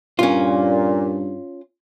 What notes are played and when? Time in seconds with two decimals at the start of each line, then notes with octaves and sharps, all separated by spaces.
0.19 G2 A#2 C#4 F4